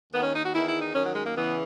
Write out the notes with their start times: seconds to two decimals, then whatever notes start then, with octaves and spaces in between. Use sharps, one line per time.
0.12 D#2 D#3 B3
0.22 C#4
0.33 D#4
0.44 F#4
0.53 E2 D#3 E4
0.67 E4
0.80 D#4
0.93 F#2 D#3 C#4
1.05 F#3
1.15 G#3
1.24 A#3
1.35 E2 C#3 E3 B3